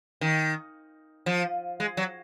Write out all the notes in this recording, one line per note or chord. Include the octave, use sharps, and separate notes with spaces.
D#3
F3
G#3
F#3